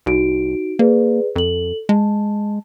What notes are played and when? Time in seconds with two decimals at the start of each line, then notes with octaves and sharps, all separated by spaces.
0.06 C2 D#4 F#4 D7
0.79 A#3 G#4 B4 D5
1.36 F2 A4 F#7
1.89 G#3 A5